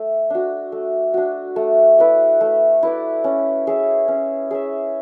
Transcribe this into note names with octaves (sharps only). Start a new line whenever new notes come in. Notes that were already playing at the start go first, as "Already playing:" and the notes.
Already playing: A3
D4 F#4
A3
D4 F#4
A3
E4 B4 D5
A3
E4 B4 D5
C#4
G#4 C#5 E5
C#4
G#4 C#5 E5